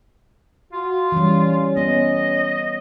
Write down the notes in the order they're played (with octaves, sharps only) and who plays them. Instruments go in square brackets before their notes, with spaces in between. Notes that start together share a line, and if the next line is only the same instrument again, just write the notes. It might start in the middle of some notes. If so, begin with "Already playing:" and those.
[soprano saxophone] F4 [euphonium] F#4
[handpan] E3 G3 [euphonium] C#4
[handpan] B3 [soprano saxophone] D#5